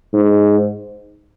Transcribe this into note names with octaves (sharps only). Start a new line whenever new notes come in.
G#2